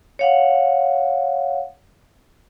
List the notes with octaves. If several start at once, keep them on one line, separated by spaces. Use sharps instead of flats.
C#5 F5 F#5